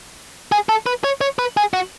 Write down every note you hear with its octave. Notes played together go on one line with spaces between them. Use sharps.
G#4
A4
B4
C#5
C#5
B4
G#4
F#4